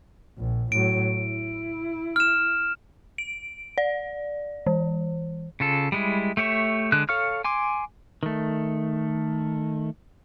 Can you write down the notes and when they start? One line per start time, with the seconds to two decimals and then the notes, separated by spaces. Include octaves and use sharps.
0.38 A#1
0.72 A2 F#3 D7
1.12 E4
2.16 F6 E7
3.18 D7
3.78 D5
4.67 E3
5.60 C#3 F4 A4
5.92 G3 G#3 E4
6.37 A3 G4 C#5 E5
6.92 D3 G#3 F#6
7.09 A4 C#5 F5 C#6 F6
7.45 G#5 C6 D6
8.23 D#3 A3